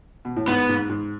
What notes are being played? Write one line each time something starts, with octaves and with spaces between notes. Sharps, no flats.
B2
A2
G#2 B3
G#2
G#2